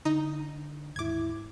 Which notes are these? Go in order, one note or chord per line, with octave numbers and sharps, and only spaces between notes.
D3 D#4
D#2 G#2 E4 D6 G#6